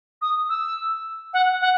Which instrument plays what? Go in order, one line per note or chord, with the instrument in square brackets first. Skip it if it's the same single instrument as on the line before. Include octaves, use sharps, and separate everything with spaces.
[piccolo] D#6
E6
F#5
F#5